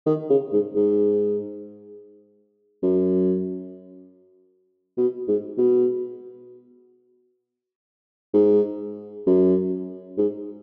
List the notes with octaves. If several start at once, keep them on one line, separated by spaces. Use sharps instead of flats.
D#3
C#3
G#2
G#2
F#2
B2
G#2
B2
G#2
F#2
G#2